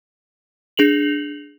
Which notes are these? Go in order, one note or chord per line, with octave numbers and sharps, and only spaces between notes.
D4 G#4 F7 F#7